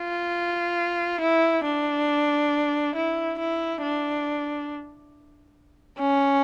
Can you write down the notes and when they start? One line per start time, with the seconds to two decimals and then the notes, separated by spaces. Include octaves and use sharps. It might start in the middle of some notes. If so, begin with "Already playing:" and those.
Already playing: F4
1.21 E4
1.64 D4
2.95 E4
3.39 E4
3.82 D4
5.99 C#4